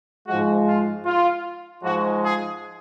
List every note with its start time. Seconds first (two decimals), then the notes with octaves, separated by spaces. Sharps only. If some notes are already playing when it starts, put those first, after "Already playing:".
0.27 G#2 F3 G#3 F#4
0.66 F4
1.05 F4
1.83 G#2 F3 G#3 F#4
2.22 G#4